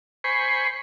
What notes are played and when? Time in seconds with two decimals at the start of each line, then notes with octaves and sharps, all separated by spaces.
0.24 C5 G#5 B5 C#6